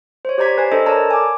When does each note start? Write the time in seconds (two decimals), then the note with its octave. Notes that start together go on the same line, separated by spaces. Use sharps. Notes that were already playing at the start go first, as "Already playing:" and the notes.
0.25 C5 C#5
0.38 G4 C5 D5 A#5 G#6 B6
0.58 B4 C5 G#5
0.72 D4 A4 C5 D#5
0.86 A4 A#4 C#5 D5 A5 A#5
1.11 G#5 D6